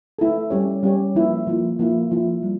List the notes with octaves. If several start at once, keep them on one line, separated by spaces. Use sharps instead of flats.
A3 E4 A4
G3 C#4 G4 C#5
G3 C#4 G4 C#5
F3 A#3 E4
F3 A#3 E4
F3 A#3 E4
F3 A#3 E4
G3